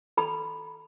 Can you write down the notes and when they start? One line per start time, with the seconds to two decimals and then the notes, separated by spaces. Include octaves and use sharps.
0.17 A4 B5